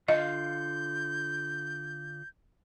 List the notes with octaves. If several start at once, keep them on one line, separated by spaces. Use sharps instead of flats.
D3 F4 D#5 F5 G6